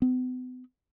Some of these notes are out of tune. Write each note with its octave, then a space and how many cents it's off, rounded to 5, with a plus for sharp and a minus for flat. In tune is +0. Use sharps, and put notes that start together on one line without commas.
B3 +40